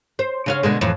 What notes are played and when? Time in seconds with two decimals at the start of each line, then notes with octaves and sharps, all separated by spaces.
0.19 C5
0.46 C#3 C#4 F5
0.63 B2 D3 G#3
0.81 F2 A2 E3